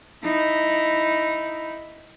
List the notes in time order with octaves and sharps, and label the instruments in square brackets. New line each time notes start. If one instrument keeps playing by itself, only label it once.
[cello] D#4 E4